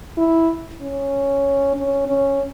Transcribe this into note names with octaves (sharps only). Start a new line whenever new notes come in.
E4
C#4
C#4
C#4